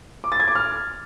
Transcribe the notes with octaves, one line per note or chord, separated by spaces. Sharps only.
D6
A6
G#6
D6
F6